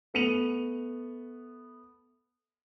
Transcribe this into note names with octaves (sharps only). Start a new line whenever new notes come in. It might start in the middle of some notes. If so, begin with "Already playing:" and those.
A3 B3 C#7 D#7 F7